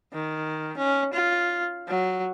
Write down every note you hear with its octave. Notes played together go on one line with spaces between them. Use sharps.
D#3
C#4
F4
F#3